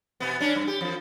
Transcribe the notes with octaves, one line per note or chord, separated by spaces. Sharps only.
B2 B3
C#4 D4
G2
G4
F2 F3